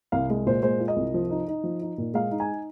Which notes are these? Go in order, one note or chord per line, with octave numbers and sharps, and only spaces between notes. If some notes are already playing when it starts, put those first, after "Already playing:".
C2 F5
G#3
A#2 C5
G#3 C5
F4
D#5
C2
F3
D#4
D#4
F3
D#4
A#2
G#3 F5
D#4
G#5